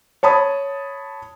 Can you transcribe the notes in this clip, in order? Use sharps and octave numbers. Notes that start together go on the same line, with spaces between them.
C#5 A5 B5 D#6